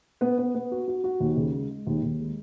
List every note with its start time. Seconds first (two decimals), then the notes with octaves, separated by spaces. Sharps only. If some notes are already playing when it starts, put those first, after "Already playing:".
0.21 B3
0.38 B3
0.55 B3
0.72 F#4
0.88 F#4
1.04 F#4
1.20 D#2
1.36 C#3
1.54 G#3
1.70 G#3
1.87 D#2
2.03 D#2
2.20 G#3